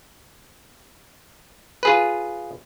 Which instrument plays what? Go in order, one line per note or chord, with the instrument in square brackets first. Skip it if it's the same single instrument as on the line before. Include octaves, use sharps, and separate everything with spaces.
[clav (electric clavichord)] F4 G#4 B4